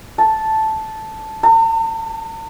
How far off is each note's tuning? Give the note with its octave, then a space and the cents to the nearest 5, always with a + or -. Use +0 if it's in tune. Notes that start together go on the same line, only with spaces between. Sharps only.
A5 -5
A5 +45